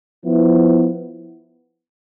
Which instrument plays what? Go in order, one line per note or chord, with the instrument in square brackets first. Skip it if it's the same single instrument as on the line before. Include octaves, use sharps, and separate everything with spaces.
[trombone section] F3 B3 E4